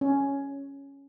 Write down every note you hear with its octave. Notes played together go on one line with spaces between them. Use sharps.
C#4